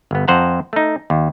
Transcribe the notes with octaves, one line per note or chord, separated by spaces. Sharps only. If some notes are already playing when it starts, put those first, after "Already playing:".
G1 B3
F2 C5 F#5 A#5
A3 D#4
D#2